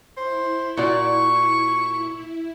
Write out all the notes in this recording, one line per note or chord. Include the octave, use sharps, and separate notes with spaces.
E4 C5
A#2 F#4 D5 C#6